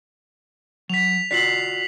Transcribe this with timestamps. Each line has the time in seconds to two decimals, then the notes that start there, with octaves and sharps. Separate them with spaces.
0.90 F#3 B6 F7
1.31 F4 F#4 D5 B6 C7 F#7